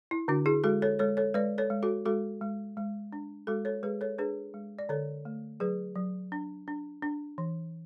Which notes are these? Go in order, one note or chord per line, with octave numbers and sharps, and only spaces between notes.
E4
D3 D4 F#4
E4 G#4
G#3 F#4 A4
A4 C#5
G#3 A4 C#5
A4 C#5
G#3 B4 D5
A4 C#5
G#3
F#4 A4
G#3 F#4 A4
G#3
G#3
D4
G#3 F#4 A4
A4 C#5
G#3 G#4 B4
A4 C#5
D4 G#4 B4
G#3
D5
D3 A4 C#5
A3
F#3 G#4 B4
F#3
D4
D4
D4
E3